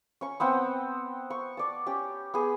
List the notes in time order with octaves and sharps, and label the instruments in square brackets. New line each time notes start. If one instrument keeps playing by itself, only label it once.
[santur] C#4 C#6
B3 C4 F#5 G5
C#6
D5 A5
C#4 G4
B3 G#4